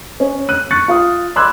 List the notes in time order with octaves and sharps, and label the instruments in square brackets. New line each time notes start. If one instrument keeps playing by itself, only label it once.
[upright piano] C#4
F#6 D#7
C#6 F#6 A6 C#7
F4 F5 D#6
B5 C6 D6 E6 F#6 G#6